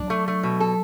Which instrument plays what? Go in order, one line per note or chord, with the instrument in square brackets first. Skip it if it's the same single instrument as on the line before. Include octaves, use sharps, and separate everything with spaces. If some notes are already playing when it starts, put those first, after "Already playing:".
Already playing: [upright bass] F#3 [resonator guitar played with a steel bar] D4
[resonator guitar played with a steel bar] A3
A3
B2
A4